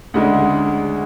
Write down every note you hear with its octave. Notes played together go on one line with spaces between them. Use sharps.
D2 C#3 G#3 D4 F#5